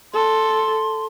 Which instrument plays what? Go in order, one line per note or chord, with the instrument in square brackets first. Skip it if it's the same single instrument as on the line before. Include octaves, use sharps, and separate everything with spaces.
[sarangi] A4 [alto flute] C6